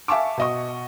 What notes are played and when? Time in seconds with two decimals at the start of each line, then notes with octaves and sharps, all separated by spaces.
0.08 E5 F5 G#5 A5 C#6 D6
0.38 B2 D#5 C#6